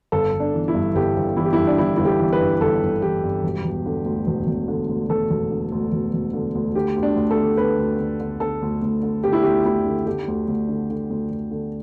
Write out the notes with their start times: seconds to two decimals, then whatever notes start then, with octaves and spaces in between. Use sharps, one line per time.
0.12 G1 A4
0.33 G1
0.40 D4
0.54 E3
0.68 E4
0.75 G2
0.95 G1 G4
1.16 G1
1.37 E3 E4
1.45 G4
1.53 G2 E4
1.67 D4
1.78 G1 E4
1.96 G1 E4
2.05 G4
2.19 E3
2.33 B4
2.41 G2
2.61 G1 A4
2.82 G1
3.02 E3 G4
3.23 G2
3.44 E1
3.64 E1
3.86 D3
4.05 D2
4.27 E1
4.47 E1
4.68 D3
4.89 D2
5.10 E1 A4
5.30 E1
5.51 D3
5.72 D2
5.92 E1
6.13 E1
6.33 D3
6.55 D2
6.75 D3 G4
6.96 D2
7.03 D4
7.16 D2
7.30 A4
7.37 D3
7.57 D3 B4
7.79 D2
7.99 D2
8.20 D3
8.40 D3 A4
8.62 D2
8.82 D2
9.02 D3
9.24 D3 G4
9.33 E4
9.42 D2 G4
9.65 D2 E4
9.86 D3
10.07 D3 G4
10.28 D2
10.48 D2
10.68 D3
10.90 D3
11.10 D2
11.31 D2
11.51 D3